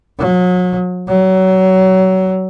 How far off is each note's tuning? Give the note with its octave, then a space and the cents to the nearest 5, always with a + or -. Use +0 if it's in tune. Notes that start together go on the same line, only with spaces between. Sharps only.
F#3 -35
F#3 +25